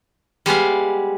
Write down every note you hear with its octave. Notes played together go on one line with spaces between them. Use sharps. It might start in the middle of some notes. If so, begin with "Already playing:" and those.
G3 G#3 B3 F5